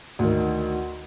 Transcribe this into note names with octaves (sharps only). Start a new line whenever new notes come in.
D2 D#3